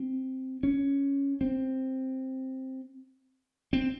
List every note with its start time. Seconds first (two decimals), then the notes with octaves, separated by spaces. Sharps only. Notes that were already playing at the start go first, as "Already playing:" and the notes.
Already playing: C4
0.63 C#4
1.41 C4
3.73 C4